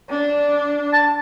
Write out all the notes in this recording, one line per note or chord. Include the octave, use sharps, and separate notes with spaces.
D4
A5